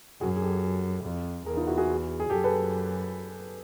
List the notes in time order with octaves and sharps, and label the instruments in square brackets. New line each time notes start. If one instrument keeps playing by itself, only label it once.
[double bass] F#2 [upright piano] F#4 G#4
[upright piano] G#4
G4 A4
[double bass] F2
[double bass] E2 [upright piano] G#4 A#4
[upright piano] D#4 F4
E4 F#4
F#4 G#4
G#4
[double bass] F#2 [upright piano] G4 A4
[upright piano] A4 B4